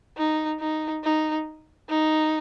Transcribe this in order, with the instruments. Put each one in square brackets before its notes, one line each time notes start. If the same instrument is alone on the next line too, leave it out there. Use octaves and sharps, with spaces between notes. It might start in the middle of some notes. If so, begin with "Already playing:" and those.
[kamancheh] D#4
D#4
D#4
D#4